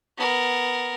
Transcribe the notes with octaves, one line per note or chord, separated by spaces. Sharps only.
B3 A#4